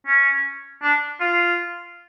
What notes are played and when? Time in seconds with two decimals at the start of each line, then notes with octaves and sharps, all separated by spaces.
0.07 C#4
0.83 D4
1.20 F4